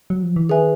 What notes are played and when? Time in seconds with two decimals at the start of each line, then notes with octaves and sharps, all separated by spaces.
0.10 F#3
0.23 F3
0.36 E3
0.49 D#3 G#4 B4 E5 G#5